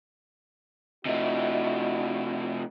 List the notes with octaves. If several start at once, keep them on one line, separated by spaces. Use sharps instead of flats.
C3 A3 D4 E4 F#4 D#5